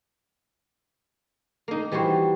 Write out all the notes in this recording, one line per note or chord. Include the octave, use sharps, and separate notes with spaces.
A#3 D#4
E3 G3 E4 F#4 C5